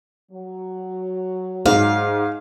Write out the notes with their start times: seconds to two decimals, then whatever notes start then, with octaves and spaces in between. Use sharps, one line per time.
0.32 F#3
1.66 G#2 F5